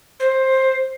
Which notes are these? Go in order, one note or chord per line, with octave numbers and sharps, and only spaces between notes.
C5